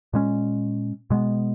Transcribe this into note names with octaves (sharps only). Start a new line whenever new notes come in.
A#2 G#3 C#4
B2 G#3 B3